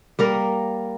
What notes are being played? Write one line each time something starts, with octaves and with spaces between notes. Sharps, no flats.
G3 A#3 A#4